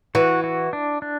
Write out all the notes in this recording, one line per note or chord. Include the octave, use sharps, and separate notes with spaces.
E3 F#4
F#4
D4
D4